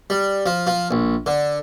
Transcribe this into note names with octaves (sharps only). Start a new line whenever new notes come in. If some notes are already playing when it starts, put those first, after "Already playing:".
G3
F3
F3
A#1
D3